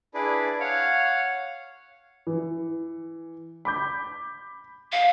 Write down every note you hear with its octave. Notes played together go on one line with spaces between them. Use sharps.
D4 E4 G#4 B4 D5
C#5 F5 F#5
E3
B5 D6 G6
F5